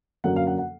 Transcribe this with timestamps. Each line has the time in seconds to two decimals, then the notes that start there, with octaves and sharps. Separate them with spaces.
0.24 F#2 D3 F#3 A#3 C#4 F#5
0.36 F5
0.47 F#5
0.58 F#5